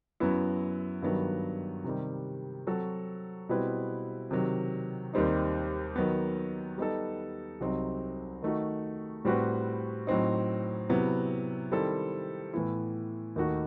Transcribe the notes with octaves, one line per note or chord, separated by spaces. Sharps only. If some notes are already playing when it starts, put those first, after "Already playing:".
F#2 F#3 B3 E4
G2 D#3 F#3 B3
C3 D#3 G3
F#3 C4 F#4 A4
B2 G3 C4 E4 B4
C3 D#3 F#3
D#2 D#3 G3 C4 D#4
D#3 F#3 B3
G3 B3 D#4 A4
C2 C3 F#3 C4 D#4
D#3 A3 D#4 F#4
A2 G3 C4 F#4 B4
A2 F#3 C4 D#4
C3 F#3 B3 E4
D#3 G3 C4 E4 A4
A2 E3 B3 E4
D#2 D#3 A3 D#4 F#4